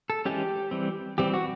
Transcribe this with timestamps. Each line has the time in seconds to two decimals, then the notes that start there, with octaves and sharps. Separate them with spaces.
0.10 A4
0.25 E3 G#3 C#4 G4
0.71 E3 G3 C4
1.18 E3 G3 C4 G4
1.34 F#4